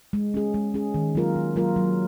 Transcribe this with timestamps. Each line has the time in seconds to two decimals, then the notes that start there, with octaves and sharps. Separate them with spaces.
0.13 G#3
0.34 C#4 G#4
0.54 G#3
0.74 C#4 G#4
0.94 D#3
1.15 F#3 A#3 F4 A#4
1.35 D#3
1.56 F#3 A#3 F4 A#4
1.76 F#3